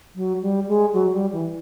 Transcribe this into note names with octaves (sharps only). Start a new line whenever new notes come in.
F#3
G3
G#3
F#3
G3
E3